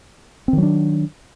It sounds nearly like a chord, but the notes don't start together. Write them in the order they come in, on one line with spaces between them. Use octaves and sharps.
C4 D#3 F#3 D4